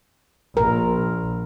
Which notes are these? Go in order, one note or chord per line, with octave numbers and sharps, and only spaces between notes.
A#1 A#4